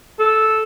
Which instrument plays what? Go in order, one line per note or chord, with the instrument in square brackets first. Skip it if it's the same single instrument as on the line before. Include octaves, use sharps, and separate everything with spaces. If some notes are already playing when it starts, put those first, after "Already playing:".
[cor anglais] A4